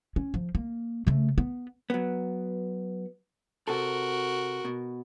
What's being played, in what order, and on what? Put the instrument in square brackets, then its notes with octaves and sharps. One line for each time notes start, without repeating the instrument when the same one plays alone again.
[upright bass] C#4
F3
A#3
C#3 A3
B3
[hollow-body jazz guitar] F#3 B3
[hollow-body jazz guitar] C3 A4 [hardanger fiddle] F#4 A#4
[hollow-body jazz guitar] B2